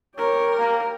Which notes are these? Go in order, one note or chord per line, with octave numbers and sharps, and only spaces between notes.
G4 A#4 C#5
A#3